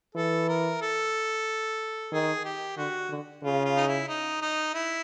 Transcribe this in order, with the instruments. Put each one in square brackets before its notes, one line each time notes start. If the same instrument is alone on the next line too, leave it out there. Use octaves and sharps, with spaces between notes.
[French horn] E3 [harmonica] A4
[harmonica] A#4
A4
[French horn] D#3 [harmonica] G#4
[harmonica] G4
[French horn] D3 [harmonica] F#4
[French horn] D3
[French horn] C#3 [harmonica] F4
[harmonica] F4
D#4
E4
D#4
D#4
E4